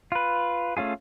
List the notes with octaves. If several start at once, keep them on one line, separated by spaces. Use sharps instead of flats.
F4 B4
A3 C#4 F4 G#4